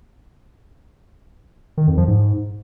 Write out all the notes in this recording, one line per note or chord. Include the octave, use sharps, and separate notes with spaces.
D#3
F2
F3
G#2